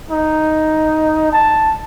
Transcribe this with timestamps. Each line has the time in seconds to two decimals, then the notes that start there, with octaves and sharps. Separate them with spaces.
0.11 D#4
1.32 A5